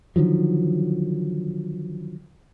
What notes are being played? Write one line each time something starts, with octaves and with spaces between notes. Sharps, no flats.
D3 D#3 F3 F#3